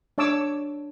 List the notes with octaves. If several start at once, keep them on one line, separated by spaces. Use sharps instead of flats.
D4 C#5 A5 D6 E6